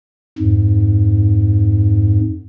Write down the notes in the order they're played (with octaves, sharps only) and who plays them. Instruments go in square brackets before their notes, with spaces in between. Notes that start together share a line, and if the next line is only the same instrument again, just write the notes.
[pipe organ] F2 G#2